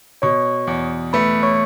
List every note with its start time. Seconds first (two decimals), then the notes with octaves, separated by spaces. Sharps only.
0.22 B2 C#5 C#6
0.67 E2
1.13 A3 B4 B5
1.43 C#5 C#6